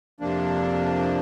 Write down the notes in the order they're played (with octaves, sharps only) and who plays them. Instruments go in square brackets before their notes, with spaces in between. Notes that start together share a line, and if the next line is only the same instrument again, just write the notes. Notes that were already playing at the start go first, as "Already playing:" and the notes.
[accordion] F2 C3 F3 A#3 D4